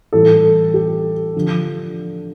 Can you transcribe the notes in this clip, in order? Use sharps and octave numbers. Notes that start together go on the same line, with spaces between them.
A2 E3 G3 A4
G4
D3 F3